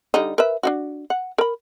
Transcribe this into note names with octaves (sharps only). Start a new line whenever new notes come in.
D3 G3 D#4
A#4 B4 E5
D4 D#4 F#4
F#5
A#4 B5